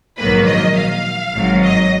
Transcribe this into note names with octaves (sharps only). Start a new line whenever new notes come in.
A#1 G#2 D#3 F#3 A#3 B4
D#5
F5
G#1 G#2 F#3
D#5